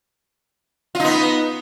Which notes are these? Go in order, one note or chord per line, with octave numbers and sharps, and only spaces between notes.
B3 D#4 F4